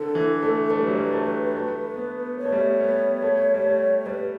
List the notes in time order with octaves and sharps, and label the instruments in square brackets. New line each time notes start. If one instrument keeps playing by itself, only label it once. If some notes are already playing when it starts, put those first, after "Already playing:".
Already playing: [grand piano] D3 [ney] A4
[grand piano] E3
A3
[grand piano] A3 [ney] B4
[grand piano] G3
F#3
G3
A3
A3
B3
[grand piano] B3 [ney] C#5
[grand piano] A3
G3
A3
B3
A3
G3
A3
[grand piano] G3 [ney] B4